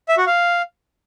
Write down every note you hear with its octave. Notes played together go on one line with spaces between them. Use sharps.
E5
F#4
F5